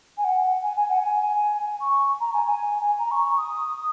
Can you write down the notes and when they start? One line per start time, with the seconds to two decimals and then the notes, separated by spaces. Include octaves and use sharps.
0.18 G#5
0.24 F#5
0.63 G#5
0.76 G#5
0.89 F#5
1.02 G#5
1.81 C#6
2.21 A#5
2.34 G#5
2.47 G#5
2.99 A#5
3.11 C#6
3.25 C#6
3.37 D#6